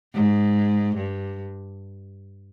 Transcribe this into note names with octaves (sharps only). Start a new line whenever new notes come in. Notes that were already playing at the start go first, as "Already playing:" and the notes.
G#2
G2